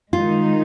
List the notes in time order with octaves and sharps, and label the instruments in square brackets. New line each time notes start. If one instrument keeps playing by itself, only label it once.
[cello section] D#3 G#3 D#4 [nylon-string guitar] F4